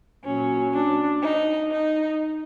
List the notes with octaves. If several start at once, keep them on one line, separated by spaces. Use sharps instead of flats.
A#2 F#3 C#4
D4
D#4
D#4